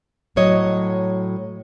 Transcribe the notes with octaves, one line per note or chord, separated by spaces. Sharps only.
A2 F#3 C#5 D#5